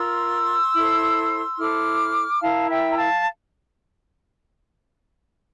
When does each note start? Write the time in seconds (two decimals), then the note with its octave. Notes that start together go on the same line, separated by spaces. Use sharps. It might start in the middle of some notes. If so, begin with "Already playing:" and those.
Already playing: F4 A#4 C6 E6
0.75 E4 A4 C5
1.58 E4 A4 C5 D6 F6
2.41 E4 A#4 F5 A5
2.68 E5 G5
2.91 A#5
2.96 F5 A5